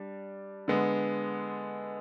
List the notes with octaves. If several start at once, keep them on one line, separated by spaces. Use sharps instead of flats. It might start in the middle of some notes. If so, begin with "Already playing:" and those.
Already playing: G3 D4
D3 G#3 B3